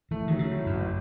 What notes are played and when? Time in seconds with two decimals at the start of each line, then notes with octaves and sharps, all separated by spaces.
0.11 E3 A3
0.28 D#3 F#3
0.39 C#3
0.52 A2
0.66 F#2
0.73 A1